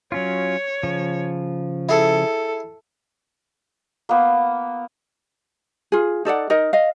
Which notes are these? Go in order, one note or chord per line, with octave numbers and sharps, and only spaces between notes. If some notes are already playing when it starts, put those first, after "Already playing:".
F#3 C#4 F4 C#5
C#3 F3
E4 G#4 A4
A#3 B3
F4 G#4
D#4 A4 D5 F#5
D#4 A#4 D#5
D#5 F5